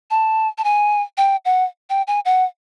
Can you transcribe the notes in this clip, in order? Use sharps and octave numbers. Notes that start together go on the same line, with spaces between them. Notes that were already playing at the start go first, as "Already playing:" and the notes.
A5
A5
G#5
G5
F#5
G5
G#5
F#5